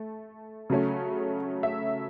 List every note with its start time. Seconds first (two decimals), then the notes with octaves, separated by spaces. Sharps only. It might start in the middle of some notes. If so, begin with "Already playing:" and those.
Already playing: A3
0.70 C#3 F#3 A3 C#4
1.63 E5